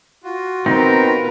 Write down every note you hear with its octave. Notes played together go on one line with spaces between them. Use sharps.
F4 F#4
B3 C4 D#4 A#4 B4